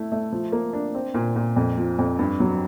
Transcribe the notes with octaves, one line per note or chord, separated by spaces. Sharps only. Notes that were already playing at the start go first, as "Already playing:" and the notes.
Already playing: A3 E4
A3
F3
A#3
D4
C4
A#2
A#2
F2
F3
F2
G2
F#3